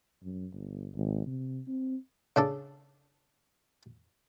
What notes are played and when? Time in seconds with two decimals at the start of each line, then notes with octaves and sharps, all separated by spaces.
0.23 F#2
0.53 G1
0.95 G#1
1.26 C3
1.67 C4
2.36 C#3 D4 A4